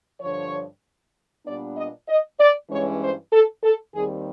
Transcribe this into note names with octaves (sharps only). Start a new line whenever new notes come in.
G2 D3 F3 C#5
A#2 G3 B3 D4 D5
D#5
D#5
D5
G2 E3 G#3 C#4 C#5
C5
A4
A4
D#2 D#3 G3 C4 G#4